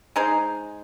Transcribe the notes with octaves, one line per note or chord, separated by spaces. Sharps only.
G#3 D#4 G#4 C5